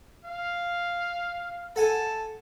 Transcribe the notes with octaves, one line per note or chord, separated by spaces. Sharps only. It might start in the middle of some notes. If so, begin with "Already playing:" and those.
F5
A4 F#5 G#5 A5